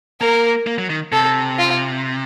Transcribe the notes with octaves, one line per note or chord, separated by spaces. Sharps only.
A#3 A#4
A#3
F#3
D#3
C3 A4
F4